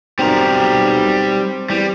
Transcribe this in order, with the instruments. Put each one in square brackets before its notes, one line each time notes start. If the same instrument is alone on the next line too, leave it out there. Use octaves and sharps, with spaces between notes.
[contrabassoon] B1 [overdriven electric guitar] G3 A#4 [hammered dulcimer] C4
[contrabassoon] E2 [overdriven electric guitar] G3